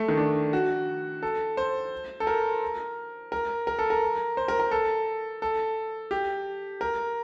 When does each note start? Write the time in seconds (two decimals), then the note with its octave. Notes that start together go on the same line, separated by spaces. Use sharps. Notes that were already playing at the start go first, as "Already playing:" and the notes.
Already playing: A3
0.09 D#3
0.18 D4
0.53 F#4
1.23 A4
1.57 C5
2.20 A4
2.27 A#4
3.32 A#4
3.67 A#4
3.79 A4
3.90 A#4
4.37 C5
4.48 A#4
4.60 A#4
4.71 A4
5.42 A4
6.11 G4
6.81 A#4